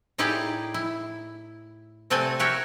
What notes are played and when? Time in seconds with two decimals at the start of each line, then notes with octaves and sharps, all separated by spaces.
0.18 A2 D#4 E4 G4 G#4 D5
0.74 E4
2.10 C3 A3 C4 A4 D5 G#5
2.39 F#4 G4 A#4 C#5 E5 G5